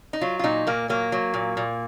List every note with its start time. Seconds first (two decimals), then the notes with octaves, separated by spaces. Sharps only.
0.13 D#4
0.21 F#3 F4
0.39 F4
0.44 A#2 D#4
0.67 A#2 A#3
0.89 F#3 A#3
1.12 F#3
1.34 A#2
1.57 A#2